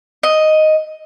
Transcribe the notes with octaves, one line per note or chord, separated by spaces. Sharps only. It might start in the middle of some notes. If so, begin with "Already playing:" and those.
D#5